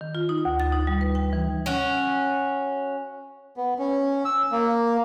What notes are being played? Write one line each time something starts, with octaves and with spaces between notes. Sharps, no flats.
D#3
F4
D#4
D2
A6
D#4
G3
B4
G5
E3
C#4 F#4
B3
C#4
E6
A#3